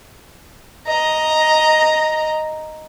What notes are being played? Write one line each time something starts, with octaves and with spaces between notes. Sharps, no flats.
D#5 A#5